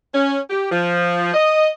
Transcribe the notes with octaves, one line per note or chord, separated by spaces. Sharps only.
C#4
G4
F3
D#5